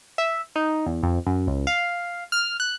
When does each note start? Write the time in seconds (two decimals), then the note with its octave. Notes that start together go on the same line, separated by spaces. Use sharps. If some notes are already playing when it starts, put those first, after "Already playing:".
0.18 E5
0.56 D#4
0.86 E2
1.03 F2
1.26 F#2
1.47 C#2
1.67 F5
2.32 F6
2.60 F#6